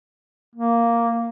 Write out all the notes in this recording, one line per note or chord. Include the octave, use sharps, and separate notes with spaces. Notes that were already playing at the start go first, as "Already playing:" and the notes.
A#3